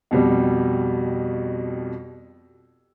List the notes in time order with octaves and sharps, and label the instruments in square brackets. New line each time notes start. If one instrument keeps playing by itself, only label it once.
[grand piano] F2 B2 G3